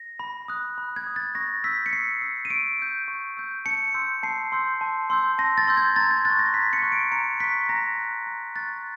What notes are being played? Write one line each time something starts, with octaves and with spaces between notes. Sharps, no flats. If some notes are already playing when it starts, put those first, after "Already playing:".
Already playing: A#6
B5
D#6 F#6
B5
G#6
D#6 F#6
A6
C#6 A#6
E6 G6 B6
C#7
C#6 C7
E6 G6
D#7
C#6 D7
E6 G6
C#6
E6 G6
A5 C#7
C6 E6 G6
A5 C7
C6 E6 G6
A5
C6 E6 G6
A5 A#6
A6
C6 E6 G6
G#6
A#5 A6
G#6
C#6 F#6 A6
A#6
A#5 B6
C#7
C#6 F#6
D7
A#5 C#7
C#6 F#6 B6
A#5 A#6
C#6 F#6
A#5 A#6
C#6 F#6 A6